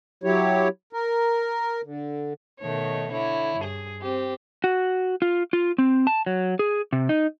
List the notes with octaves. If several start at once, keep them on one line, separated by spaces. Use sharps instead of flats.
F#3 E4 G4 C#5
A#4
D3
B2 D#3 A3 C#5
D3 E4 C#5
G2 G#4
C4 G4
F#4
F4
F4
C4
A5
F#3
G#4
C3
D#4